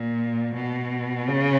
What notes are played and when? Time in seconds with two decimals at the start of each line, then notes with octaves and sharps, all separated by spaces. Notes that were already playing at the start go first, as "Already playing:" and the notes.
Already playing: A#2
0.55 B2
1.28 C#3